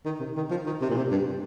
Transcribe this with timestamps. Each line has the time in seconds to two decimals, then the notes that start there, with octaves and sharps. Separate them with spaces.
0.05 D#3
0.20 C3
0.36 D#3
0.50 F3
0.66 D#3
0.81 C3
0.89 A#2
0.97 C3
1.11 G2